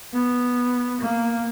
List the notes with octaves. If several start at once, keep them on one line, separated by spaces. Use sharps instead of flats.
B3
A#3